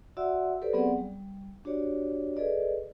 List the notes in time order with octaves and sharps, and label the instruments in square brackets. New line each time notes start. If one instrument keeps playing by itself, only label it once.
[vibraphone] F#4 D5 E5 F#5 C6 E6
G4 A4 B4 C5 D5
F#3 B3 C4 G#4 D5 F#5
G3
D4 F#4 G4 C#5 D5
G#4 A4 B4 D5 D#5